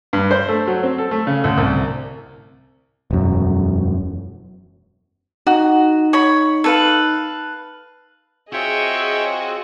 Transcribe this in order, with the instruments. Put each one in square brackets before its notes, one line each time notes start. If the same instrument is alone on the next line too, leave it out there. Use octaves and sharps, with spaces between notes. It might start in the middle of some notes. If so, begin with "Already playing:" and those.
[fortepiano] G2
C5
A3
F#3
C4
A4
A3
C#3
D2
C2
[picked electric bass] E1 F#2
[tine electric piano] D#4 [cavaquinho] F#4
[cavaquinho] C#5 B5
A4 B4 F5
[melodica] C4 F4 [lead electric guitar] F#4 [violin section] G#4 D#5 [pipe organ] C#5 E5 G5